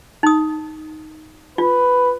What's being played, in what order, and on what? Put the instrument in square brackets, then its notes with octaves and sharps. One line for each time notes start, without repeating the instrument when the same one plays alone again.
[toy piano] D#4 D#6
[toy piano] F4 [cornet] B4